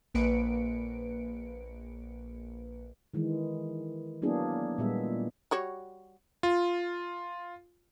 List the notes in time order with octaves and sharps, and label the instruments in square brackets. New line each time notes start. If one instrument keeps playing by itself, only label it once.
[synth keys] A#1 A#3 B4 C#7 D7
[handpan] D#3 E3 G#3
F#3 A#3 B3 D4 E4 G#4
A#2 G3 G#3 B3 E5
[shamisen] G3 F#4 C#5
[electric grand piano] F4